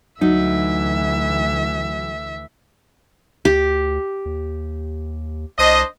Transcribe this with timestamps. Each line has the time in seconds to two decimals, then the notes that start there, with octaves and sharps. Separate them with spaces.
0.21 D2 E3 F#3 D#4 E5
3.45 D2 G4
4.25 D#2
5.58 C2 D4 C5 D#5